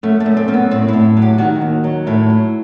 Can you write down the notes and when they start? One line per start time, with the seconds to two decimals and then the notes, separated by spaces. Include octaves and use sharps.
0.03 F#2 A3
0.20 A3
0.26 F#2
0.37 C4
0.48 F#2 C4
0.54 B3
0.71 A2 C4
0.88 E4
0.93 A2
1.17 F#3
1.22 G4
1.38 D#3 F#4
1.61 D#2
1.84 F#3
2.07 A2 E4
2.30 F#3